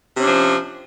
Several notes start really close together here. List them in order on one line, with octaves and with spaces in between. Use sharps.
C3 C#4 D4 F3